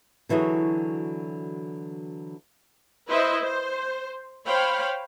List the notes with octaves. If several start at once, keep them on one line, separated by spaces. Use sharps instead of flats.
D3 E3 F#3 F#4 G#4
E4 B4 C5 D#5 E5
C5
C5 C#5 F5 G5 B5